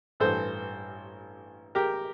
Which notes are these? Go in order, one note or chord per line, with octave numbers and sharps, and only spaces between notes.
A1 G2 E3 A4 C5
G4 A#4